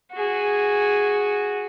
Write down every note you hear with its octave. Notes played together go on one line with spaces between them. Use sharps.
F#4 G#4